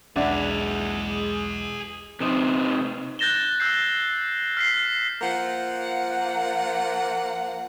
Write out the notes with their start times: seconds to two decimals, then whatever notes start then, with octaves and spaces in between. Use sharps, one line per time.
0.16 B1 E2 G#3 D4 G#4 B4 E5 F#5
2.20 C3 D#4
3.19 F#6 G6 A6 A#6 E7 G7
3.60 E6 G6 C7
4.57 F6 B6 C7
5.22 F3 A#3 F5 F#5